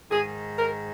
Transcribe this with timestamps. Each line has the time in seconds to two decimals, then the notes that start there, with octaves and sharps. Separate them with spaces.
0.11 G#2 D#3 G#4
0.58 A#4